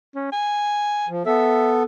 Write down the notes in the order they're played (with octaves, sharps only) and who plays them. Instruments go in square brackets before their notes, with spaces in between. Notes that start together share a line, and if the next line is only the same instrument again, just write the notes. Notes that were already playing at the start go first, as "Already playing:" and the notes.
[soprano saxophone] C#4
G#5
[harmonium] F3
[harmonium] B3 A4 [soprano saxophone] E5